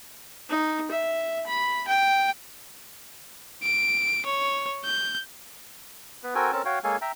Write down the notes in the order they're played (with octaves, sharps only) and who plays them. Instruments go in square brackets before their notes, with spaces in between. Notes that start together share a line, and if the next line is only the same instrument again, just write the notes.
[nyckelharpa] D#4
E5
B5
G5
[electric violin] D7
C#5
G6
[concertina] B3 B4
C4 F#4 A4 A#4 G5 G#5
C4 C#4 A4 A#4 A5
F#4 C#5 F5 G5
G#3 A#3 A4 C#5 F5 G#5
E5 G5 A#5